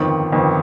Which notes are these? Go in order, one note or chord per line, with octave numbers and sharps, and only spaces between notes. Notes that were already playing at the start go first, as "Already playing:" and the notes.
Already playing: G1 F2 D#3
G1 F2 D#3